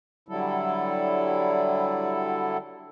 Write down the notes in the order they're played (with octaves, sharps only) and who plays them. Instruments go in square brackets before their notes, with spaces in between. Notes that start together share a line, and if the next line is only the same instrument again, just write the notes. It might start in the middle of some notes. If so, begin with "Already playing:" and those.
[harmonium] D3 F#3 G3 E4 A4